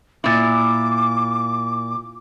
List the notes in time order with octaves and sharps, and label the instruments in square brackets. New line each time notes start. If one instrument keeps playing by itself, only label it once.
[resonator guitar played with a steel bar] A#2 E4 [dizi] D6